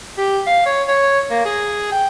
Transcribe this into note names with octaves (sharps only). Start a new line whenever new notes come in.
G4
F5
C#5
C#5
A#3
G#4
G5